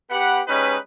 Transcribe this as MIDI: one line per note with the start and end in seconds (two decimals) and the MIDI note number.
0.10 0.40 59
0.10 0.40 67
0.10 0.40 71
0.10 0.40 78
0.48 0.76 55
0.48 0.76 56
0.48 0.76 61
0.48 0.76 63
0.48 0.76 71